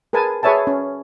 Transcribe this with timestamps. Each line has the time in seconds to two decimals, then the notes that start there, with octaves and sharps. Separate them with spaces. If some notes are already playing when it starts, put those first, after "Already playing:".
0.13 G#4 A#4 B4 G#5 A5
0.43 G#4 B4 C#5 E5 G#5 A5
0.67 C#4